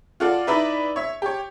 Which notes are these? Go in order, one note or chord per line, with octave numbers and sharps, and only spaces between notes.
F4 F#4 A4 D5
D#4 E4 B4 D5 E5 B5
C#5 E5
G4 C#5